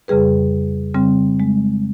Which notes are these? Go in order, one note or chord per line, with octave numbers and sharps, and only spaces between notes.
F2 C#3 G3 G#4 B4
C#3 G3 C4
G#3